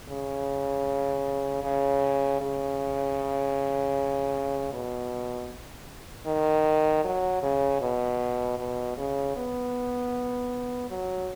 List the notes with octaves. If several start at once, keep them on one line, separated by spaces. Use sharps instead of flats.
C#3
C#3
C#3
B2
D#3
F#3
C#3
B2
B2
C#3
B3
F#3